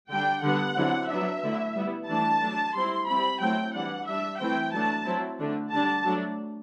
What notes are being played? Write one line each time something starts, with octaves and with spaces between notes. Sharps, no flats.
D3 G3 D4 G5
D3 G3 B3 F#5
D3 F#3 C4 E4
F#3 B3 D4 E5
D3 A3 E4
G3 B3 E4
E3 A3 D4 A5
F#3 A3 D4
G3 C4 E4 C6
G3 C4 E4 B5
F#3 A3 C4 E4 G5
E3 G3 D4 F#5
G3 D4 E5
E3 A3 C4 E4 G5
F#3 A3 D4 A5
F#3 C4 E4
D3 A3 D4
D3 G3 D4 A5
F#3 A3 D4